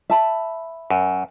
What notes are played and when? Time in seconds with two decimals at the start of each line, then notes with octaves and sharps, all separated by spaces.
0.10 E5 A5 B5
0.90 F#2